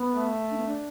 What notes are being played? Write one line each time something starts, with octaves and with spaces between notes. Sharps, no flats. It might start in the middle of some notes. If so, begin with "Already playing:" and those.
Already playing: B3
A3
D4
B3
D4